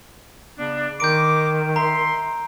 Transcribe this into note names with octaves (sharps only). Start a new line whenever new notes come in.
C#3 B3 D4
D#3 A#5 C6 D6 G6 D7
E5 A#5 C6